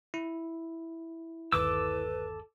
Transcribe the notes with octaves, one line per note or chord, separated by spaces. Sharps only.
E4
G1 D#2 A4 B4 D6 E6